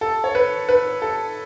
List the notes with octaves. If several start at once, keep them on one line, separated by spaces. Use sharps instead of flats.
A4
C#5
B4
B4
A4